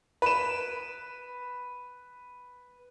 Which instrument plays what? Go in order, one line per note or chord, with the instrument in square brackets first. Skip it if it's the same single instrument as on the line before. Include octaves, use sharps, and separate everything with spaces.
[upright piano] B4 E7